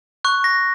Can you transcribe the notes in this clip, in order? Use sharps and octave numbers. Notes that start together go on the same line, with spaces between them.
C#6 F#6
A#6